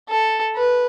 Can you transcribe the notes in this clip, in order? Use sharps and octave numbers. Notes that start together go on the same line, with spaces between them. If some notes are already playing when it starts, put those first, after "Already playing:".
A4
B4